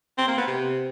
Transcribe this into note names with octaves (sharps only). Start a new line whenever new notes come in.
C4
A#3
B3
C3